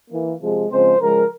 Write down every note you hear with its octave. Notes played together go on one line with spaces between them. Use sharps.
E3 A#3
C3 F3 G#3
C#3 F3 G#3 C4 C5
C#3 F3 G#3 A#4